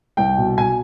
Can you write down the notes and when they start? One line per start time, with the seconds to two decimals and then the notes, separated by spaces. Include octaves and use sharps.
0.17 C2 G5
0.37 B2
0.57 B2 G#5